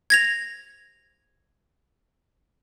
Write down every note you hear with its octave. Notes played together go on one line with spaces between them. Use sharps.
G#6 A#6 F7